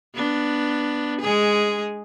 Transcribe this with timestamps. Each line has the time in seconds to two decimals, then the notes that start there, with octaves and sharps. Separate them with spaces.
0.14 B3 D4
1.21 G#3 G#4